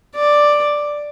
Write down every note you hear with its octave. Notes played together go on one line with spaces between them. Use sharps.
D5